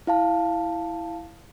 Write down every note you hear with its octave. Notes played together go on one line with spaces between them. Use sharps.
E4 F5 A5